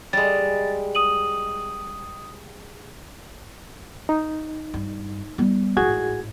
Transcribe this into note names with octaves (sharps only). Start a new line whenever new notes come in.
G3 G#3 A6
D#6 D#7 F#7
D#4
G2
G3 B3
A1 G#2 F#4 G#4 G#6